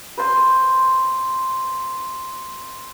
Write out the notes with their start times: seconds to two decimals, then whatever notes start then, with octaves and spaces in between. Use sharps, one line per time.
0.17 B4 C5 C6